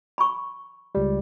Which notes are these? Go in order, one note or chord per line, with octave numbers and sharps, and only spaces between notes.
B5 C#6
C#2 G3